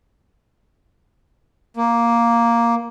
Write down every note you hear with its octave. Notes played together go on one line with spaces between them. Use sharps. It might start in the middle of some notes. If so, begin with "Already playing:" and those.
A#3